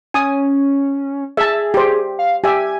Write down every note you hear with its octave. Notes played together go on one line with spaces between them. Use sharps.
C#4 G#5 D#6
G#4 E5 A5
G4 C5
F5
G4 E5 G#5